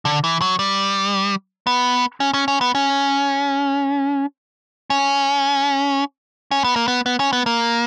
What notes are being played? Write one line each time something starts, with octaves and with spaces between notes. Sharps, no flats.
D3
E3
F#3
G3
B3
C#4
C#4
C#4
B3
C#4
C#4
C#4
B3
A#3
B3
B3
C#4
B3
A#3